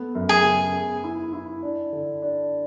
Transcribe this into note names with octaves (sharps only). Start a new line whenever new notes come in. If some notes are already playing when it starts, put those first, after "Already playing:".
Already playing: A3 B3
F#2
G#4
C#3
B3
E4
E4
D4
D3
D4